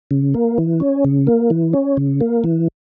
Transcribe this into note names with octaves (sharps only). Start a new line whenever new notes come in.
C#3
A#3
E3
C#4
C#3
A#3
E3
C#4
C#3
A#3
E3